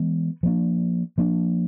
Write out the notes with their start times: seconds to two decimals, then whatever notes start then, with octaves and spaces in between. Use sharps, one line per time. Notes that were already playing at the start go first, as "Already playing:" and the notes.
Already playing: E3 G#3 B3
0.43 F3 A#3 D4
1.18 F3 A#3 D4